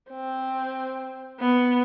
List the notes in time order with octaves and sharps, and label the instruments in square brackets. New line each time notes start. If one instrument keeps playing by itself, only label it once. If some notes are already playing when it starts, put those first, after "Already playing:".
[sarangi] C4
B3